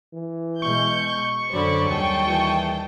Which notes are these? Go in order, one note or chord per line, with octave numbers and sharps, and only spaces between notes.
E3
B2 G#3 C#6 G6
F#2 D3 F#3 C5 D5 B5
D#2 G3 G#4 G5 A5
E3